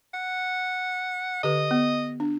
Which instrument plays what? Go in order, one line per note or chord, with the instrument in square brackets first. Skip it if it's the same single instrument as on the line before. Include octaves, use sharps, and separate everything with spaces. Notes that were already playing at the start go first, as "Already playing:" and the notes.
[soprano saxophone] F#5
[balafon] D3 G4 B4 [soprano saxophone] D#5
[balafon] B3
D4